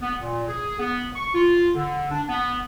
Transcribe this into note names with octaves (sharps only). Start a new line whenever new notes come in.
B3
A#2
G#4
B3
C#6
F4
D3
D4
B3